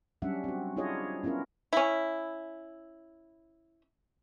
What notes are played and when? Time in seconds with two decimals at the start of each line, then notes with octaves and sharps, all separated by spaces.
0.22 F#3 G3 C#4 D4 E5 F#5
0.44 C4 F#4
0.77 D4 E4 F4 G#4 C#5 D#5
1.23 B3 C#4 E4 F4 A#4
1.73 C#4 E4